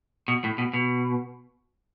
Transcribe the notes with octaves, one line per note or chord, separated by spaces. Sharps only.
B2
A2
B2
B2